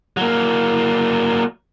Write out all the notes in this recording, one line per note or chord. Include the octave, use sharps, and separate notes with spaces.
F#3 A#3